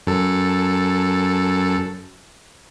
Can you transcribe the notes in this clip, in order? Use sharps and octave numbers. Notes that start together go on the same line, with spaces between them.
F#2 A4